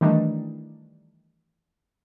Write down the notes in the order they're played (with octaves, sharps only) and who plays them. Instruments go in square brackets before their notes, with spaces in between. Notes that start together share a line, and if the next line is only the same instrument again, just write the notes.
[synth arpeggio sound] D#3 E3 G3 A3 D4 D#4